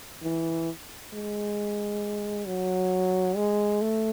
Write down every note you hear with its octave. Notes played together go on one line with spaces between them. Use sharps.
E3
G#3
F#3
G#3
A3